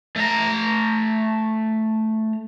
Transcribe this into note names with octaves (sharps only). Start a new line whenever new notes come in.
A3 A#5